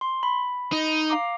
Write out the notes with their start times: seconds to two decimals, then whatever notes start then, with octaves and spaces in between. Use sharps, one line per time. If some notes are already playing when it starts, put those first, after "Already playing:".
0.01 C6
0.23 B5
0.72 D#4
1.10 F5 A#5 D6